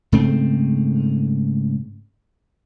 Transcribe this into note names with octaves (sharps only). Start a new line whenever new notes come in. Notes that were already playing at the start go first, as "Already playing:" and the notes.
G#2 C#3 A3 C4